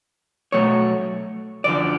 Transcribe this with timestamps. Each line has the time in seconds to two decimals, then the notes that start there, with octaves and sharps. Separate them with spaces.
0.52 B2 F#3 A3 C#5
1.64 F#2 D3 F3 D5